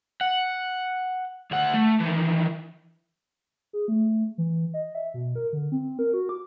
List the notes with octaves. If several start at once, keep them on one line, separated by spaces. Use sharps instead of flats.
F#5
D2 F#5
A3
D#3 E3
G#4
A3
E3
D#5
E5
B2
A#4
D3
C4
A#4
F#4
D6